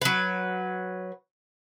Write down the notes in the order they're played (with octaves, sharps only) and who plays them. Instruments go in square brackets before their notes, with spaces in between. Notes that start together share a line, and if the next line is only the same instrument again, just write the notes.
[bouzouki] F#3 B4